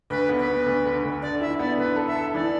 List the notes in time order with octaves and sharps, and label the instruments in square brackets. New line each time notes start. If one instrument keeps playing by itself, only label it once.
[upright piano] D2 [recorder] B4
[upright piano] B3
[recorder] B4
[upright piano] B3
D2
D3
D2
[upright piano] D3 [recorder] D5
[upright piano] E4 [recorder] E5
[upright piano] B3 [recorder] D5
[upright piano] D3 [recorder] B4
[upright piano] A4
[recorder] E5
[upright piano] A4
[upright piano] E3 [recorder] D5